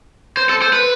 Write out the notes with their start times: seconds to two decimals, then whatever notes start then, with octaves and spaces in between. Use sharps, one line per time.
0.37 C5
0.49 A4
0.62 C5
0.73 B4